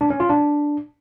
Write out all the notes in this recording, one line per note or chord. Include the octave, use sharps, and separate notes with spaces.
D4
C#4
F4
D4